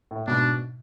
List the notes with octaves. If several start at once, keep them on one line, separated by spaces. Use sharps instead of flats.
A2
G#2 B2 D4